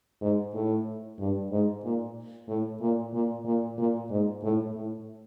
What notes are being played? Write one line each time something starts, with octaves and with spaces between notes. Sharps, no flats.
G#2
A2
G2
G#2
A#2
A2
A#2
A#2
A#2
A#2
G#2
A2
A2